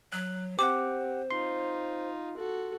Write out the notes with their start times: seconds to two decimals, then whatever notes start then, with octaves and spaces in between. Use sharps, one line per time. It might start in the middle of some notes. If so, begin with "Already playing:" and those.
0.13 F#3 F#6
0.59 C4 G4 C5 F#5 D6
1.31 D#4 F4 C6
2.37 F#4 A4